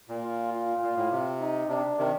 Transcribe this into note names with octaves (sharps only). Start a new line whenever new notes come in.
A#2
F4
F4
A#2
A2
C3
D#4
C3 D4
C3 D#3